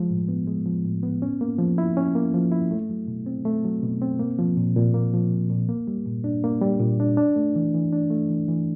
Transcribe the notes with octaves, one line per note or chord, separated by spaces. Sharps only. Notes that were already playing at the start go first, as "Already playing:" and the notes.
Already playing: F3 G#3
A2
B3
G#3
F3
A2
B3
C#4
A#3
F3
E4
C#4
A#3
F3
E4
A3
F#3
B2
C4
A3
F#3
B2
C4
A#3
F3
A#2
A#2
A#3
F3
A#2
A#2
A#3
G3
A#2
D4
A#3
G3
A#2
D4
D4
A3
E3
E3
D4
A3
E3
E3